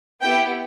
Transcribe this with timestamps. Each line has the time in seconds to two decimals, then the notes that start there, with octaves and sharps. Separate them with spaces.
0.21 B3 E4 G4 G5